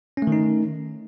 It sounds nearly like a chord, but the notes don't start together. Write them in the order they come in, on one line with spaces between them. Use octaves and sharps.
C#4 A3 D#3 D#4